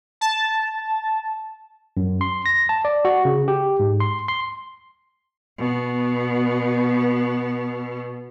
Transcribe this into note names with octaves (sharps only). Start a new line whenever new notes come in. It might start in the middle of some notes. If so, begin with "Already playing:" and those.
A5
F#2
C6
A#6
A5
D5
F#4
C#3
G4
G#2
C6
C6
B2 B3